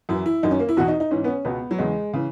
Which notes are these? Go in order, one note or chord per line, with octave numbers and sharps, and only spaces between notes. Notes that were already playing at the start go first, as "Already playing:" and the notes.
F#2 E3 E4
E4
F#2 D#3 D#4
C#4
A#3
E4
E2 B2 F#4
D#4
D#4
G#2 E3 C#4
B3
C#4
C#2 B2 B3
F#3
E2 C#3 E3 G#3
C#3 E3